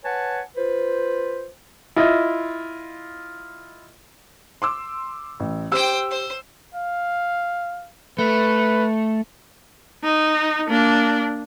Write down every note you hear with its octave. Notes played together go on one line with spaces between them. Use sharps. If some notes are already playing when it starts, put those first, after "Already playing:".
B4 C#5 F#5 G#5 A5
F4 B4 C5
E4 F4 D#5
C6 D6 E6
A1
G4 C5 G5 E6
C5
F5
A3 B4
D#4
A#3 D4